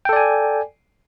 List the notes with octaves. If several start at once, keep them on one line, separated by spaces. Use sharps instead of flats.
A4 D5 G5 G#5